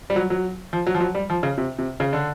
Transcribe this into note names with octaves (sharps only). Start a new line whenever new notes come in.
G3
F#3
F#3
F3
F#3
F3
F#3
G3
F3
C#3
C3
C3
C#3
D3